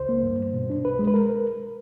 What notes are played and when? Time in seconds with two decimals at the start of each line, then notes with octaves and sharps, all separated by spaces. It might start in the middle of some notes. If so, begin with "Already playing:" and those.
Already playing: C#2 C5
0.09 A#3
0.23 G2
0.39 G2
0.54 B2
0.70 D4
0.85 C2 B4
0.99 G#3
1.07 B4
1.14 A#4